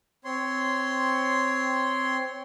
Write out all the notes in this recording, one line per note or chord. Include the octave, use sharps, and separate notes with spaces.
C4 C#5 C6